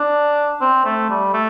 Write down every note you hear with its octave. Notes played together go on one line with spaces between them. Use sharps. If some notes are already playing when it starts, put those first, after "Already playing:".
Already playing: D4
C4
A3
G3
A3